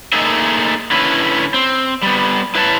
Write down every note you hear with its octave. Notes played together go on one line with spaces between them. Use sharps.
A3 A#3 D#4 G#4 D#5 E5
D3 A3 C#4 E4 B4
C4
G3 B3
E4 B4 C#5 E5 A5